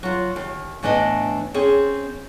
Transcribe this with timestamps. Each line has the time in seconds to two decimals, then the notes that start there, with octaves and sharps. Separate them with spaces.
0.03 F#3 F4
0.36 D#2
0.83 A2 E3 B3 D4 D#5
1.54 C4 C#4 G#4